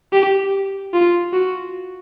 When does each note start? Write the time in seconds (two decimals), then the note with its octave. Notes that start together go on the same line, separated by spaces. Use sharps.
0.13 G4
0.94 F4
1.33 F#4